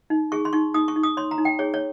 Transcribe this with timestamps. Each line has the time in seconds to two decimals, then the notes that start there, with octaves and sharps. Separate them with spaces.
0.10 D#4
0.32 G#4 C#6
0.45 C6
0.53 D#4 C#6
0.74 D#4 D#6
0.88 C#6
0.96 D#4
1.03 D#6
1.17 C#5 C6
1.31 A#5
1.38 D#4
1.45 G5
1.59 G#4 C#5
1.74 C#5